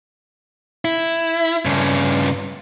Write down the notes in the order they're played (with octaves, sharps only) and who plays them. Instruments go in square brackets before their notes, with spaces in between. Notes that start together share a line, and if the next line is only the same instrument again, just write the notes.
[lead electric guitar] E4
G2 C#3